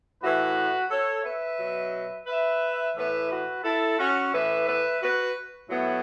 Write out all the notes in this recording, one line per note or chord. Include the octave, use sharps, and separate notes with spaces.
A2 E3 F#4 B4
A4 C#5
B4 E5
B2 F#3
B4 E5
A2 E3 B4 E5
F#4 B4
E4 A4
C#4 F#4
A2 E3 B4 E5
B4 E5
F#4 B4
A2 F#3 B3 E4